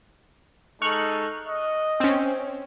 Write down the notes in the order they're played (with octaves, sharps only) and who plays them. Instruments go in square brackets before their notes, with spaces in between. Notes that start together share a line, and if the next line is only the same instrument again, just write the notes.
[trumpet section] G#3 D#4 A4 [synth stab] C#6 F6 F#6
[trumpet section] D#5
[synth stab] C4 C#4